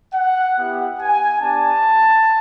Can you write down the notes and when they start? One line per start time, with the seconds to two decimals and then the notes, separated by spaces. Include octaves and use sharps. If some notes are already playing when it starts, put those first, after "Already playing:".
0.14 F#5
0.56 B3 E4 G4
0.99 G#5
1.41 B3 D4 G4 A5